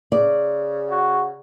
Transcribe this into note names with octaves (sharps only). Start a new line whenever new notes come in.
C#3 D5
F#4